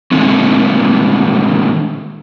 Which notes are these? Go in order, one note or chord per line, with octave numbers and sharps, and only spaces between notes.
A#2 D3 D#3 G#3 A3 C4